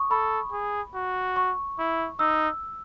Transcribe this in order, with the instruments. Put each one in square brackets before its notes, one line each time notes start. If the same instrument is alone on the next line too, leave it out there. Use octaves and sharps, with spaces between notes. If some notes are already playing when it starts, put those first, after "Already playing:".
Already playing: [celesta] C#6 D#6
[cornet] A4 [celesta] B5
[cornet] G#4
F#4
[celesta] C#6
[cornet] E4
[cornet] D#4 [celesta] E6